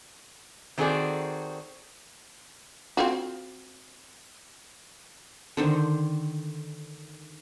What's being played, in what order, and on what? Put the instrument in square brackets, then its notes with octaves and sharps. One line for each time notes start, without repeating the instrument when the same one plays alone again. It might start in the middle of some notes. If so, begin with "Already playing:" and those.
[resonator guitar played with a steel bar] D#3 C4 F#4 G#4 A4 D5
[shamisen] C4 F4 F#4
[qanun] D3 D#3 C5